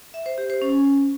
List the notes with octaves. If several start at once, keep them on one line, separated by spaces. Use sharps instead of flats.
E5
C5
G4
C5
C#4